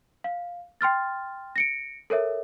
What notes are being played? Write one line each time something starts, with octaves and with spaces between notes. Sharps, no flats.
F5
G5 C6 F6 A6
A#6 C#7 D7
A4 A#4 C#5 E5